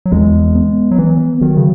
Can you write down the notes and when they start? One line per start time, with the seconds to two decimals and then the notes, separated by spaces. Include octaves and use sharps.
0.06 F#3
0.12 E2 G#3
0.55 B3
0.91 F#3
0.98 E3 B3
1.41 D#3 F#3
1.57 C#3